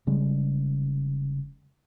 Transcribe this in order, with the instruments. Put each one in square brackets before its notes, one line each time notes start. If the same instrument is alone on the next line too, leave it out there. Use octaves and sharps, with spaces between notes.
[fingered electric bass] F1 C#3 G3 G#3